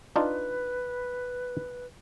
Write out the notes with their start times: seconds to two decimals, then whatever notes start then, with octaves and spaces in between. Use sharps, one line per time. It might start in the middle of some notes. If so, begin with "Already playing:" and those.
0.16 D4 D#4 F4 B4